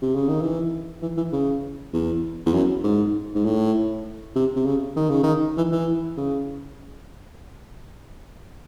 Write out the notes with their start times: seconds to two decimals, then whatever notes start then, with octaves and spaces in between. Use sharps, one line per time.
0.02 C3
0.15 C#3
0.28 D#3
0.41 E3
1.02 E3
1.17 E3
1.33 C#3
1.93 E2
2.46 E2
2.54 F#2
2.84 G#2
3.35 G#2
3.45 A2
4.36 C3
4.56 C3
4.66 C#3
4.96 D#3
5.10 C#3
5.23 D#3
5.57 E3
5.72 E3
6.17 C#3